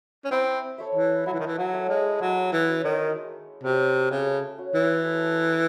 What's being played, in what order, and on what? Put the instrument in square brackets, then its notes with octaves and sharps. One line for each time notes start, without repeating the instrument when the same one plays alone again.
[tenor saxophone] C#4
[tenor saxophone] C4 [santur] E4
[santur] A4 C#5 E5
[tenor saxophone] E3
[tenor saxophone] F#3 [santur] E4
[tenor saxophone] E3
D#3
E3
F#3
[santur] A4 C#5 E5
[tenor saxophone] G#3
[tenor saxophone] F#3 [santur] G#3
[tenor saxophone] E3
[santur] C#4 F#4
[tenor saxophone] D#3
[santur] G#3
[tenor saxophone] C3 [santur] C#4 F#4
[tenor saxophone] C#3 [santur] A3
[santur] C#4 F#4 C#5
[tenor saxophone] E3
[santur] A3